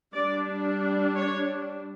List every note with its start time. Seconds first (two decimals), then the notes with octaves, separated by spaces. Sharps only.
0.13 G3 D4 D5
1.16 C#5